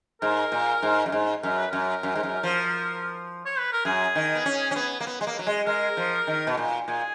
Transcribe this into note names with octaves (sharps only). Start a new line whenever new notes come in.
G#2 A#4
A#2
G#2
F#2
G#2
F#2 A#4
B4
F#2 A#4
F#2
G#2
F#2
F3
C#5
B4
A#4
F#2 G#4
D#3
B3
C#4
C#4
B3
A#3
B3
G#3
A#3
F#3
G#3
G#3 A#4
F3
D#3
B2
A#2
A#2 G#4